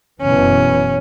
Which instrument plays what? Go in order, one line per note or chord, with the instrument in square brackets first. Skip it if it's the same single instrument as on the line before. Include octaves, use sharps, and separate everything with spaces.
[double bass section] F#1 B2 E3 [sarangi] C#4